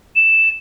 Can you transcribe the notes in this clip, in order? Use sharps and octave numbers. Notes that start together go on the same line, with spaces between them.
E7